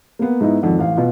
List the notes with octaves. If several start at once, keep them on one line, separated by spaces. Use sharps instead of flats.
A#3 B3
G#2 B3 D#4 E4
G#1 F2
A1 F5
B2 F4